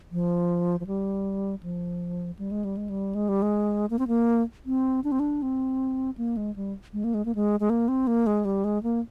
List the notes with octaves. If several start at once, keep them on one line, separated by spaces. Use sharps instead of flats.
F3
F3
G3
F3
G3
G#3
G3
G#3
G3
G#3
G3
G#3
A#3
C4
A#3
C4
D4
C4
D4
C4
A#3
G#3
G3
G#3
A#3
G#3
A#3
G#3
G#3
A#3
C4
A#3
G#3
G3
G#3
A#3